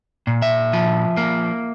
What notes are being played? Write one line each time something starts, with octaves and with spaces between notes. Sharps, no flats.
A#2
E5
F3
A#3